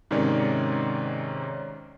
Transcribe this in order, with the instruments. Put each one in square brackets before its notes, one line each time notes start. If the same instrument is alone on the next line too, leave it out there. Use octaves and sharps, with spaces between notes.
[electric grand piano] G#2 C3 D#3 C#4 C#5 D5